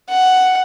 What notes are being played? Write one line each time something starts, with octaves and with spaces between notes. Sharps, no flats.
F#5